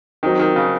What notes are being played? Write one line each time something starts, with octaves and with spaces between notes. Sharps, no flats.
D#3 F#3 C4 D#4
D#3
C#3